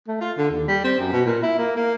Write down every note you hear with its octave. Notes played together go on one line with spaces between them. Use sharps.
A3
F4
D3
D#2
G3
C4
F#2
B2
A#2
E4
A#3
A#3